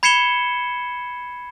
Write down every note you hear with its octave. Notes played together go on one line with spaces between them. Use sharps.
B5 G#6 C7 C#7 E7 G7